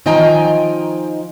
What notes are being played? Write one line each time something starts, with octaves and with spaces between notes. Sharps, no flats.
D#3 F3 D#5 G5 G#5 A#5